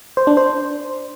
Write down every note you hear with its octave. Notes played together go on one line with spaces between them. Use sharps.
C5
D4
C5